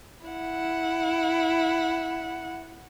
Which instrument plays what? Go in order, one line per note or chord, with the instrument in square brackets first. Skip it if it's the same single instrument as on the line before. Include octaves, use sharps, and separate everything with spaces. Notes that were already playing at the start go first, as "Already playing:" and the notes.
[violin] E4 F#5